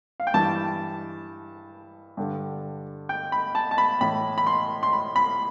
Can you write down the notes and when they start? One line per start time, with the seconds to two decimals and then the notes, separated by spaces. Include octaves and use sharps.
0.20 F5
0.27 G5
0.34 G2 E3 A5
2.17 G2 D3
3.09 G5
3.32 B5
3.55 A5
3.71 A5
3.78 B5
4.01 A2 E3 B5
4.38 B5
4.47 C6
4.83 C6
4.93 B5
5.16 B5